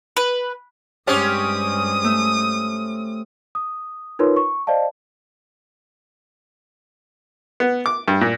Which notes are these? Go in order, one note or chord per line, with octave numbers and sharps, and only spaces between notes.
B4
G2 G#3 C4 C#4 G4 D#6
A3
D#6
D#4 F4 A#4 B4 C#5 C6
C#6
C5 D5 D#5 F5 A5
B3
D6
G2
A#2